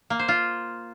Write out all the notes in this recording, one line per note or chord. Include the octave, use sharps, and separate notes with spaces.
A#3
C5
F4